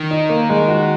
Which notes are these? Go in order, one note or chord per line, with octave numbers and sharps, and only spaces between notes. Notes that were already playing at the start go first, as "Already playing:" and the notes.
Already playing: D#3
D#4
A#3
G#3
F#4